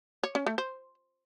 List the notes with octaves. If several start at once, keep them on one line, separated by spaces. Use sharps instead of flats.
C#5
C#4
A3
C5